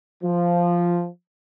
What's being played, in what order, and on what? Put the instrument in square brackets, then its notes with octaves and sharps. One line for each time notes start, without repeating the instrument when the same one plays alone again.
[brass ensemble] F3